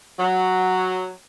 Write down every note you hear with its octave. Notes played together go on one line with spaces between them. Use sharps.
F#3